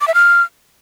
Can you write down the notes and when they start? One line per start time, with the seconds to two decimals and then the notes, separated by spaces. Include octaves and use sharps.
0.01 D6
0.08 E5
0.14 F6